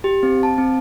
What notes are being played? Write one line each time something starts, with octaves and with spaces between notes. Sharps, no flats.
G4
C4
A5
C4